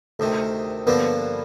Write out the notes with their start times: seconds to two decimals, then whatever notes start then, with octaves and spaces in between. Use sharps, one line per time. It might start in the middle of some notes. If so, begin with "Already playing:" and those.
0.19 D2 C3 D#3 A3
0.86 G2 D3 F3 A#3 B3 D4